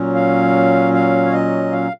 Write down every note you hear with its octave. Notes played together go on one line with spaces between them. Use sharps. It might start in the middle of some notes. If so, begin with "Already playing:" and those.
Already playing: A#2 F#3 C#4
F5
F5
C#5
D#5
F5